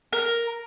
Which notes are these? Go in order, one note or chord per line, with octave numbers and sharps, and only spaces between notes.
A#4